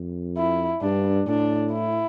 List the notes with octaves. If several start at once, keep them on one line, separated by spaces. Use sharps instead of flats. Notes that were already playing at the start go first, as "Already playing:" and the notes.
Already playing: F2
E4
G2 D4
A2 D4
E4